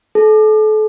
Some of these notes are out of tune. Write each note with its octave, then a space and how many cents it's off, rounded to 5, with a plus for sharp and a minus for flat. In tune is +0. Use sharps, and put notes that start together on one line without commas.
A4 -35